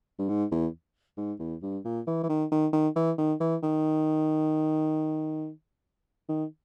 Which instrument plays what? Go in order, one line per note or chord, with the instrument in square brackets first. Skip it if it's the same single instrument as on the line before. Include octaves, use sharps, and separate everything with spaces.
[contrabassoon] G2
G#2
E2
G#2
E2
G2
A#2
E3
E3
D#3
D#3
D#3
E3
D#3
E3
D#3
D#3